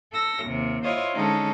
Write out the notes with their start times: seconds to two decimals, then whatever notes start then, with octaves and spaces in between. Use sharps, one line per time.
0.12 A4 E6 A#6
0.44 D#2 C3
0.82 E4 F4 C5 C#5 D#5
1.13 D3 G#3 C#4 D#4 A4